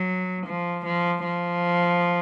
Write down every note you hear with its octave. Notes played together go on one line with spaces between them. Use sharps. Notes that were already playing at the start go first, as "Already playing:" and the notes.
Already playing: F#3
F3
F3
F3